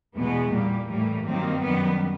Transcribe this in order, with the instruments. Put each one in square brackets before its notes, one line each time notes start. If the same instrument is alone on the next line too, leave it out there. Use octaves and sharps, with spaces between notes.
[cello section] E2 B2 G#3 B3
A#2 G3 A#3
A2 E3 G3 A#3
G2 D#3 F#3 A#3 C4
F#2 D#3 G3 B3